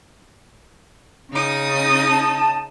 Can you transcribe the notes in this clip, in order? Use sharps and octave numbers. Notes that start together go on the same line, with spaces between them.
C#3 D#4 D#6
A5